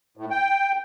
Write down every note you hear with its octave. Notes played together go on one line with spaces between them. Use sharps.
A2
G5